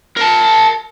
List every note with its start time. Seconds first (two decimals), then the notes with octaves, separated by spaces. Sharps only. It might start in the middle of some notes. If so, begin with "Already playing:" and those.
0.17 A#4 A5